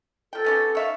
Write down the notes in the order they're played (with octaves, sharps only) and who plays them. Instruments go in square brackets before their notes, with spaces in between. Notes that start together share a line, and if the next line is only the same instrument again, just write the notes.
[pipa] F3 G5 [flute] A4
[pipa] B3 C#4 G4
C#5 E5 F5